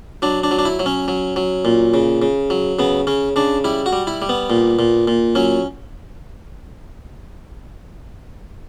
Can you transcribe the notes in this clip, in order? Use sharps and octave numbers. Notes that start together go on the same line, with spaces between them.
F#3 D4
D4
F#3
D4
E4
F#3
C#4
F#3
F#3
A#2
C#3
C#3
F#3
C#3 B3
C#3 C#4
C#3 D4
G3 E4
F#4
G3
E4
G3
B3
A#2
A#2
A#2
F#3 C#4